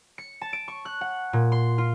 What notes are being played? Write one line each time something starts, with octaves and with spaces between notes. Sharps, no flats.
C#7
A5
D7
C#6
F#6
F#5
A#2
C6
F4